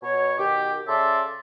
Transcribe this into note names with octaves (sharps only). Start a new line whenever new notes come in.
B2 C#5
B2 D#3 G4
C#3 A4 D5 E5 C6